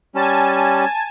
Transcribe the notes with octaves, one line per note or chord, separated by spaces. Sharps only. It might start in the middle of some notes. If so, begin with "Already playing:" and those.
G3 C#4 G#5 A5